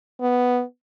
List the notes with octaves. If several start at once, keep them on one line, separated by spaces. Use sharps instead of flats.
B3